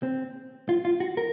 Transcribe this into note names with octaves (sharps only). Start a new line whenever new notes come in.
C4
F4
F4
F#4
A#4